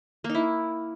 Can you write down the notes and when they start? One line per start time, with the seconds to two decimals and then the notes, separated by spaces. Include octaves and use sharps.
0.24 A#3
0.29 D#4
0.35 E4